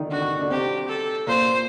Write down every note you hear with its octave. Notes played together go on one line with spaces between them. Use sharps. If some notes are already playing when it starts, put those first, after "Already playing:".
Already playing: D3 D#3 D4 D#4
D3 D4 F#4
D#3 D#4
D3 D4
C3 C4 G4
A4
A#2 A#3 C5